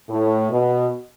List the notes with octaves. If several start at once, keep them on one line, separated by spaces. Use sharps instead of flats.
A2
B2